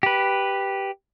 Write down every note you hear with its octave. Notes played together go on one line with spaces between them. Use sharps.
G4 B4